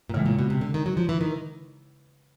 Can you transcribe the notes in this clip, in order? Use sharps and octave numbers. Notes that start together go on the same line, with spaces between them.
A#2
A2 C#3 E3 G#3
A#2
B2
C3
D3
D#3
F#3
F3
E3
D#3